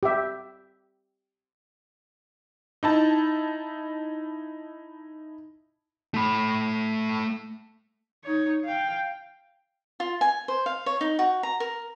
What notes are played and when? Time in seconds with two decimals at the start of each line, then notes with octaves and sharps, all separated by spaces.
0.03 G4 E5
2.83 D#4 E4 A5
6.14 A3 B5
8.24 D#4 C#5
8.65 F5 G5
10.00 F4
10.21 G#5
10.48 C5
10.66 F5
10.86 C#5
11.01 D#4
11.19 F#4
11.43 A#5
11.60 A#4